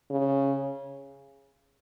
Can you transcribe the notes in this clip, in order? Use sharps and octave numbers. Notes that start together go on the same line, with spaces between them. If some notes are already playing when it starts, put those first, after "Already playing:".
C#3